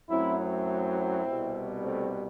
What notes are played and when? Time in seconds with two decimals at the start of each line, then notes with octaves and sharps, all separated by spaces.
0.09 F#2 F#3 A3 C4 E4
0.39 C4 E4
1.26 C2 B2 G3
1.83 A3 C4